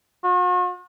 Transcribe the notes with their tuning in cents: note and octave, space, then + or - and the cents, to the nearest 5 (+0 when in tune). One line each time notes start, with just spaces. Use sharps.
F#4 -45